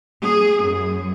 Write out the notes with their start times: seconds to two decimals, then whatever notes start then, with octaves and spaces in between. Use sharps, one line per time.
0.22 G#4
0.61 F#2